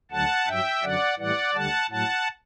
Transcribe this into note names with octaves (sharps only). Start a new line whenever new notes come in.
D2 D3 F#3 F#5 A5
G2 F#3 E5 G5
F#2 D3 F#3 D5 F#5
A2 E3 G3 D5 F#5
D2 D3 G3 F#5 A5
A2 F#3 F#5 A5